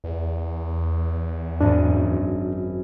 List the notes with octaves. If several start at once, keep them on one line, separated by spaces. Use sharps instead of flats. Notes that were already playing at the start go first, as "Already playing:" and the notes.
E2
G#1 F#2 D4